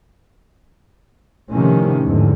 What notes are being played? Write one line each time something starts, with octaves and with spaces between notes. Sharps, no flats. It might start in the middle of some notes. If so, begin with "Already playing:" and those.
A2 C3 D#3 F3 C#4
E2 G#2 D3